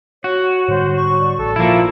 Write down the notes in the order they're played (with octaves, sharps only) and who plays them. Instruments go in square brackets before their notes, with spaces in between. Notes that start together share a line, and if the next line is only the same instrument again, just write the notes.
[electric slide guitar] F#4 [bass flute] C#5
[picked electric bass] G#2 D3 G3 [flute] C5
[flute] C#6
[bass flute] D5
[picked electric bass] A1 [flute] A4
[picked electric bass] A#2 [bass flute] F3 [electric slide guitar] A#3 E4